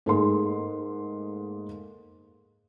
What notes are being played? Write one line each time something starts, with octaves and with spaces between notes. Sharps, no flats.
G#2 A3 A#3 G#4 C6